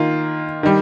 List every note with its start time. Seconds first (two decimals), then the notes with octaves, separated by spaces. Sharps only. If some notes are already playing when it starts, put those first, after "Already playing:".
Already playing: D#3 A#3 F4
0.63 D#3 G3